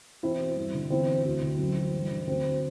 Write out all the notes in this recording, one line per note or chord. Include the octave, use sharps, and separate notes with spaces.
E2 C4 E4
B2
G2
D3
E2 C4 E4
B2
D2
D3
F#2
E3
G2
D3
D2 C4
D2